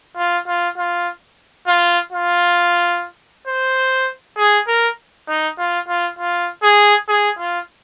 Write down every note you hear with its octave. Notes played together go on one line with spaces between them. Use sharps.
F4
F4
F4
F4
F4
C5
G#4
A#4
D#4
F4
F4
F4
G#4
G#4
F4